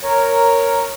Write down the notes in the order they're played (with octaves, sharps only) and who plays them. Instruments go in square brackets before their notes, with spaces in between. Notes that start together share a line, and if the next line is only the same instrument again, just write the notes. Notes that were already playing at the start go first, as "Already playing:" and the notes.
[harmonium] A#4 C#5